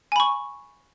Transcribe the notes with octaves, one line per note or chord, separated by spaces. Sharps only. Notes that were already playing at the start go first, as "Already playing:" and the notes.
G#5 B5 C#6